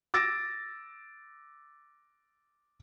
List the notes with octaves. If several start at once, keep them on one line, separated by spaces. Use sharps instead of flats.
D6 E6 A6 A#6 D7